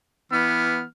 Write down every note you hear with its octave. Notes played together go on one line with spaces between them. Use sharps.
E3 B3 F6